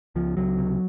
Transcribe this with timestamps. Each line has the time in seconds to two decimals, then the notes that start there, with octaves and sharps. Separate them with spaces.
0.16 C#2 F3
0.37 C#2 F#3
0.59 C3